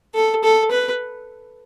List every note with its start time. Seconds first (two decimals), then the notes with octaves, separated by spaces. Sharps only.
0.15 A4
0.44 A4
0.71 B4